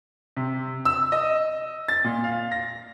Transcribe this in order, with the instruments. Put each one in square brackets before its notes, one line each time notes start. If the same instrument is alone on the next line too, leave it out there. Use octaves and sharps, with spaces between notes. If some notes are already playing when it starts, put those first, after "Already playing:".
[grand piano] C3
E6
D#5
A6
A#2
F5
A#6